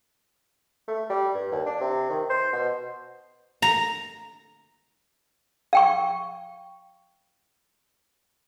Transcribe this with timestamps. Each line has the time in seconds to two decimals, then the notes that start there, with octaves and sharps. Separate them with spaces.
0.88 A3
1.10 G3
1.35 G2
1.52 D#2
1.66 D4
1.81 C3
2.10 D#3
2.30 C5
2.53 B2
3.62 A#5
5.73 F5 G5 C#6